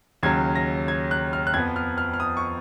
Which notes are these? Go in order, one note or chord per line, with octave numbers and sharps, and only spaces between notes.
D#2 C#3 F#3 G#6
A#6
G#6
F#6
F6
F#6
F2 F3 B3 G#6
F6
F6
F6
D#6
C#6